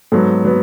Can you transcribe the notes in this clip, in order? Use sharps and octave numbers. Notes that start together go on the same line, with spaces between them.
G#2 F#3 B3 A4
F#3 B3